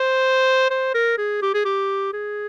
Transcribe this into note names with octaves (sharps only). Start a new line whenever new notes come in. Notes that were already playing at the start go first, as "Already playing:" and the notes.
Already playing: C5
C5
A#4
G#4
G4
G#4
G4
G#4